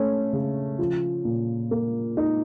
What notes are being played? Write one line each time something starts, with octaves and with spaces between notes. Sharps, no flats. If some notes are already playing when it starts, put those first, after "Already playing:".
Already playing: A3 C#4
C#3
F3
A#2
A#3
D#4